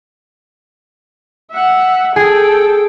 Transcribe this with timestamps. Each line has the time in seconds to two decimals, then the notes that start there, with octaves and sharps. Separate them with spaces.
1.52 E5 F#5
2.16 G#4 A4 G5